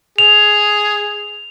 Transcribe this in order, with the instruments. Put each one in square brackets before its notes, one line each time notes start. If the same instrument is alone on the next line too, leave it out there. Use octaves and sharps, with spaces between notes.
[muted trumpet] G#4 [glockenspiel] F7